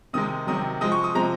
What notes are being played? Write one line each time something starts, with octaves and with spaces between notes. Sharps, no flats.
C3 D#3 G#3 D#6
C3 D#3 F#3 D#6
C3 F3 G#3 D#6
C#6
D#6
C3 F3 G#3 A#5